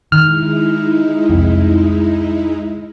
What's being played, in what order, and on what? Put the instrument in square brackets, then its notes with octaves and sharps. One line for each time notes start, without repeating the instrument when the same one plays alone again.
[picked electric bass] D#3 [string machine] G#3 D#4 E4 [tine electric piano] F6
[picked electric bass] C2 F2